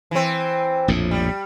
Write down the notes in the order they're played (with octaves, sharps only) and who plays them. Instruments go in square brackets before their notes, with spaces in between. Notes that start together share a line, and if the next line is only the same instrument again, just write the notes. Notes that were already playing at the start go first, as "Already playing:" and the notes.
[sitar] E3 C4
[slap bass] A#1 F2 A2
[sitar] G3